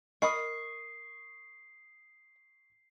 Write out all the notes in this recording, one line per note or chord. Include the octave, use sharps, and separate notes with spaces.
A#4 D#5 B5 C#6 D#6 C7